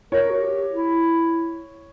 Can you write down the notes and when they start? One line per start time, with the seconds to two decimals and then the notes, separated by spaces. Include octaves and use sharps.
0.12 A#4 C#5
0.30 F#4
0.41 G4
0.70 E4